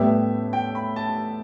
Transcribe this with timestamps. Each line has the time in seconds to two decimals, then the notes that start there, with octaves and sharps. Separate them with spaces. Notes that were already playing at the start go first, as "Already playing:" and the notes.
Already playing: A2 G3 B3 G4 E5
0.53 G5
0.75 B5
0.96 A5